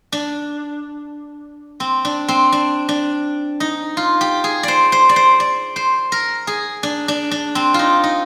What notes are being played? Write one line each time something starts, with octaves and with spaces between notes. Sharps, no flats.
D4
C4
D4
C4
D4
D4
D#4
F4
G4
G#4
C5 D5
C5
D5
C5
D5
C5
A#4
G#4
D4
D4
D4
C4
D#4 F4
D#4